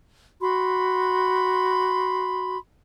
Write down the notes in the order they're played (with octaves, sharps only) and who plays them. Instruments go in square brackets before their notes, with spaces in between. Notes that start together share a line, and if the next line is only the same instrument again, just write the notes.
[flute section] F#4 B5 C6